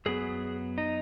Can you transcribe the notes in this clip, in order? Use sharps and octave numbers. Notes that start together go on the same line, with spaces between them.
F#2 F#3 B3 G#4
D#4